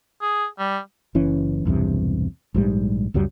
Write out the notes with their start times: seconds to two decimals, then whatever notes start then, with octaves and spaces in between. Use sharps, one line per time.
0.22 G#4
0.59 G3
1.15 F#1 E3 C#4
1.65 B1 E2 G2 C3
2.54 A#1 G#2 D#3 G3
3.14 C#2 F#2 F#3 G3